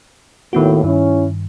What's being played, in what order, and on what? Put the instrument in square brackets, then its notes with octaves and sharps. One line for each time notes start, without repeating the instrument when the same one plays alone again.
[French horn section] D#2 A2 [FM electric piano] D#3 B3 F#4
[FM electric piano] G2 D#3 [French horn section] C#4 E4